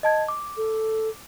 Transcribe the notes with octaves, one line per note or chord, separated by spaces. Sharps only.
D#5 A5 G#6
D6
A4